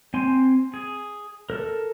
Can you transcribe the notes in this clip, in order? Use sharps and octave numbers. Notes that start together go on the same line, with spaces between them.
C4 G#5 C6
G#4
A4 A#4